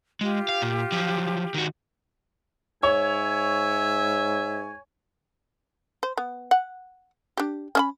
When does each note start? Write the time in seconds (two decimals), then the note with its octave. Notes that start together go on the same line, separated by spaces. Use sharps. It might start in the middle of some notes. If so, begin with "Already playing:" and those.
0.21 G#3 F4 G4
0.49 F5
0.62 A#2
0.92 F3 F#3
1.54 D#3 F#4
2.83 G#2 C#5 E5 G#5
6.03 C5
6.18 B3
6.51 F#5
7.37 D4 G4
7.75 C#4 E5 B5